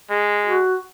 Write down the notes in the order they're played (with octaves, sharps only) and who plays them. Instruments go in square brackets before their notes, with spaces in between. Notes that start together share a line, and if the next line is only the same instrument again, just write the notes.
[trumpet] G#3
[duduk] F#4